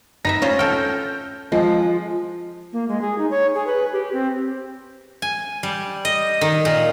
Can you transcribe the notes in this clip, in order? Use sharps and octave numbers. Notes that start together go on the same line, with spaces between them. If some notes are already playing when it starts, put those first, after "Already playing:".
D#4 B4 E5 A#6
C#4 F4 C5
A4 G5 F6 G6
F3 G#3
A#3
G#3
G#4
D#4
C#5
G#4
B4
G4
C4
G#5
G3
D#5
D#3
A#2